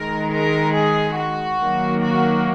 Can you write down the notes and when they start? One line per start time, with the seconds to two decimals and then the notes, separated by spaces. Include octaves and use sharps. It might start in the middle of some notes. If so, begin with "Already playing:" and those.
Already playing: D#3 G#3 A#4
0.30 A#4
0.74 G#4
1.17 F#4
1.60 D#3 F#3 A#3
2.02 F#4